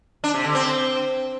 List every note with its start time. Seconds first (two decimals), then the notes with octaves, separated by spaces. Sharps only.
0.24 D4
0.34 C3
0.44 D3
0.55 C4